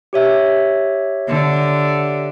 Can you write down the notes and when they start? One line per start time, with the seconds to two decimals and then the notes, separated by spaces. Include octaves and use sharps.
0.13 G4 C#5 E5
1.28 D3